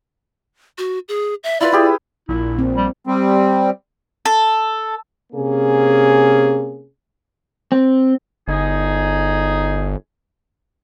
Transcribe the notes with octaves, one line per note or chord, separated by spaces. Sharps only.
F#4
G#4
E5
E4 F4 B4 D5
E4 G4 G#4
A#1 A#2 E4
C4
G3
G3 C4
A4
C3 A#3 C#4 G#4
C4
G1 D#4 G#4